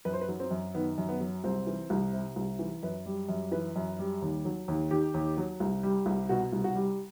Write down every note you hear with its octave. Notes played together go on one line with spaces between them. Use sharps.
F#2 B4
C5
B4
F#3
C4
F#2
D#3 B3
F#2
B3
F#3
C2 C4
E3
C2
C3
C2
E3
F#2 B4
G3
F#2
E3 B4
F#2
G3
D#2
F#3
D#2
D#3 G4
D#2
F#3
C2
G3
C2
B2 F#4
C2
F#4
G3